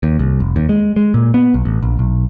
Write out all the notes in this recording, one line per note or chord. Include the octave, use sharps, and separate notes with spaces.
D#2
C2
F1
D#2
G#3
G#3
A#2
B3
B1
A1
A#1
B1